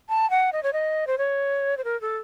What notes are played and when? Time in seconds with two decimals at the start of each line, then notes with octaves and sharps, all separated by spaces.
0.09 A5
0.30 F#5
0.53 D#5
0.63 C#5
0.73 D#5
1.07 C5
1.18 C#5
1.77 C5
1.84 A#4
2.01 A4